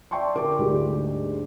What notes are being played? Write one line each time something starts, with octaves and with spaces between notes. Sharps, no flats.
D5 E5 G5 A5 C6 C#6
D3 F4 A#4 D6
D2 G#2 D3 G3 G4